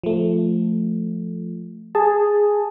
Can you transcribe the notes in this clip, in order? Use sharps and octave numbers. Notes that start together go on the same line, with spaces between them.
F3 A3
G#4 A5